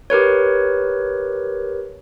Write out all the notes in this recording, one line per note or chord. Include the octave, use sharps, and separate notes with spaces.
G4 A#4 B4 C#5